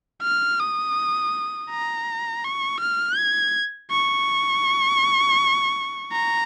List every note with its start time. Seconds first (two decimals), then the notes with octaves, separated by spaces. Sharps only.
0.22 F6
0.60 D#6
1.70 A#5
2.44 C#6
2.81 F6
3.17 G#6
3.91 C#6
6.12 A#5